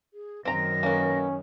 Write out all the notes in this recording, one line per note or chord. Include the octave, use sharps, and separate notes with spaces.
G#4
F#2 D#3 C4 A#5 A#6
A#3 B3 C#4